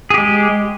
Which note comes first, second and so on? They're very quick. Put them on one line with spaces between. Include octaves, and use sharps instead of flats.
G#4 G4 G#3